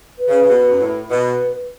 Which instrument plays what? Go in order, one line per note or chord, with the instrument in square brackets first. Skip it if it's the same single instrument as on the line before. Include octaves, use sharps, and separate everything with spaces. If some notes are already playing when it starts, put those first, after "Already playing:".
[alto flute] B4
[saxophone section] C#3
C#3
B2
F#2
A2
[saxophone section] B2 [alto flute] B4